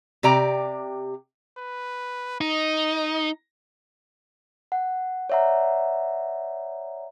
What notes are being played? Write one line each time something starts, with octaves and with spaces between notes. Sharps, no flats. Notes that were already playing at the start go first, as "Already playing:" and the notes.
C3 G4 D5 A#5
B4
D#4 D#5
F#5
C#5 D5 E5 F#5 A#5